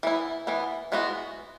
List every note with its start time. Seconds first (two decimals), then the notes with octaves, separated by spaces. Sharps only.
0.03 E3 B3 E4
0.47 E3 B3 E4
0.92 E3 G#3 B3 F#4